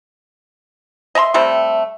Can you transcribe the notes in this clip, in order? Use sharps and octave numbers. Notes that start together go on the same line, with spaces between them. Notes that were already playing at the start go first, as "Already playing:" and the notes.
D#5 E5 A#5 C6
C3 G3 A3 C4